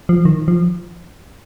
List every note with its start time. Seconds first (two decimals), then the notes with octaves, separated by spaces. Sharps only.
0.09 F3
0.25 D#3
0.48 F3